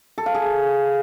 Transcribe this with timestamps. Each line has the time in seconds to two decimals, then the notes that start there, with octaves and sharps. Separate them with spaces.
0.18 A4
0.26 F5
0.35 G#4